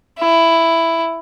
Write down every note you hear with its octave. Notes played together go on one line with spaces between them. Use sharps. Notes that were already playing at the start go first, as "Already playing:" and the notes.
E4